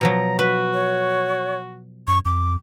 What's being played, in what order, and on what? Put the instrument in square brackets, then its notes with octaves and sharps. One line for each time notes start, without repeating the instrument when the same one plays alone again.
[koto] B2 F3 F#3 [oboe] A#5
[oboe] F#4 [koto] B4
[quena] C#5
[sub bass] F#2 [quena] C#6
[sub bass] F2 [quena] D6